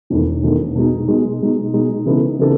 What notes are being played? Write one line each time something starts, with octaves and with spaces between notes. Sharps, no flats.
E1 E2 D#3 A3 D#4
E1 E2 D#3 A3 D#4
B2 G#3 D#4
B2 G#3 D#4
B2 G#3 D#4
B2 G#3 D#4
C#3 E3 B3 D#4 A4
C#3 E3 B3 D#4 A4